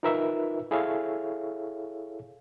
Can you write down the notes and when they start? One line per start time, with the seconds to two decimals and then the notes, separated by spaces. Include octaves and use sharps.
0.03 D#4 F4 A#4 B4 E5
0.71 E4 G#4 A4 C#5 E5 F5